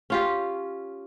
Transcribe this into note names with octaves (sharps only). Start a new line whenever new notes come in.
C#4 F4 G4